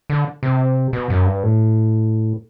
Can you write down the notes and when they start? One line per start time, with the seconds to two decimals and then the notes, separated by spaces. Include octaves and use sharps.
0.10 D3
0.43 C3
0.93 B2
1.10 F#2
1.26 G2
1.43 A2